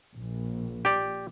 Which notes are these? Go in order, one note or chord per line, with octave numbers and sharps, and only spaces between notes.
A#1
G4 D5